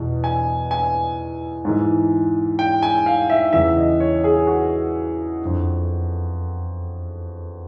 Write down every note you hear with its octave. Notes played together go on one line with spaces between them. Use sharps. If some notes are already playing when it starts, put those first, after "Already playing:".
Already playing: E2 B2
G#5
G#5
G#2 E3
G5
G#5
F5
E5
E2 C#3 E3 E5
D#5
C#5
G#4
F#4
F2 D3